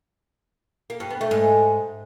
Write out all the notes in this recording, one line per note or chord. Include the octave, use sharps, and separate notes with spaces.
A#3
G2
B3
A3
G#2